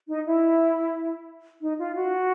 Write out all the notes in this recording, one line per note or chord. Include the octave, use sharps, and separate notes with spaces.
D#4
E4
D#4
F4
F#4